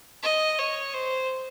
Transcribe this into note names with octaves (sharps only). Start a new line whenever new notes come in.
D#5
C#5
C5